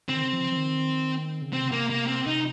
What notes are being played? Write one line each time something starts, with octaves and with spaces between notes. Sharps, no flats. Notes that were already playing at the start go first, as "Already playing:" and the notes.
C#3 C4
D#3
C#3
F3
F3
D#3
C#3
C3 C4
A#3
A#3
C4
C3 D#4